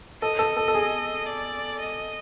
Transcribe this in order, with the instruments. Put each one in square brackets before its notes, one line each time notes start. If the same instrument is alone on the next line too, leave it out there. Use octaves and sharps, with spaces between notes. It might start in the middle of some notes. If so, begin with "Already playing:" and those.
[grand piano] A4 [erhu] D#5
[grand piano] A4
A4
A4
G#4
[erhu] D5
D#5